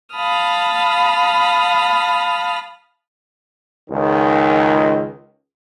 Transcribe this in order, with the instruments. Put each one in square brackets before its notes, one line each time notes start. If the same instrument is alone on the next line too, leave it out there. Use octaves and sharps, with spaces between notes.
[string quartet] F5 A5 B5 D#6 F6
[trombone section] C#2 D#3